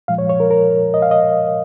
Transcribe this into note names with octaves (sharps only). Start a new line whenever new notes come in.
A#2 F3 G#3 F5
C#5
C#5
A#4
A#4
D#5
F5
D#5